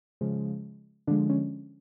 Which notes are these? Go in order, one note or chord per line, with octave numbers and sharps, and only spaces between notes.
C#3 F3 G#3
D3 F3 G#3 D4
C#4